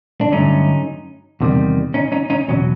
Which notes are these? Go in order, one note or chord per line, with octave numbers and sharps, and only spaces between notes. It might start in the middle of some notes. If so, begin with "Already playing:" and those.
D4
G2 D3 F#3 A3 C#4 D#4
E2 C3 D#3 G3
C#4 D#4
C#4 D#4
C#4 D#4
E2 B2 F#3 C#4